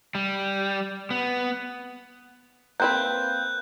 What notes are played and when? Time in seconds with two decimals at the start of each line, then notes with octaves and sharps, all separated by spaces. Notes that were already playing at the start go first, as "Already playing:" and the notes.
0.15 G3
1.11 B3
2.80 A#3 C4 B4 F#6 G6